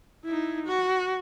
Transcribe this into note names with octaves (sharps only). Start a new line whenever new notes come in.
D#4 E4
F#4